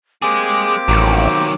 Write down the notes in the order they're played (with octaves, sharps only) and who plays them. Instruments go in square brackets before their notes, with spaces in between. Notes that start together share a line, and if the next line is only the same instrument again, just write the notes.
[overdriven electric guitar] G#3 G#4 [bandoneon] A#3 C4 G4 [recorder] D6
[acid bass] A1 [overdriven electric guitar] D#3 F#3